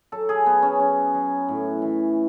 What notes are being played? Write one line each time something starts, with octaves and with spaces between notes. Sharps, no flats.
F#3 A4
G#4
F#3 B3
C#4
F#3 C#4
F#3
A2
E3